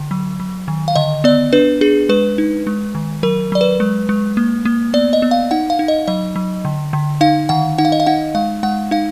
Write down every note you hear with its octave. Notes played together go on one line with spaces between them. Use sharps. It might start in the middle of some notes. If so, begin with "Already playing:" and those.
Already playing: D3
F#3
F#3
D#3
F5
D3 D#5
B3 D5
D4 B4
D4 G#4
G#3 B4
D#4
G#3
D#3
F#3 A#4
F#3 D5
B4
G#3
G#3
A#3
A#3
B3 D5
D#5
B3
F5
D#4 F#5
F5
D#4
D#5
F#3 D#5
F#3
D3
D3
D#4 F5
D#3 F#5
D#4 F#5
F5
D#5
F5
D#4 F#5
G#3 F5
G#3 F#5
D#4 F5